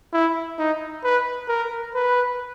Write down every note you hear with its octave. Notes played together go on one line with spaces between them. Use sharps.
E4
D#4
B4
A#4
B4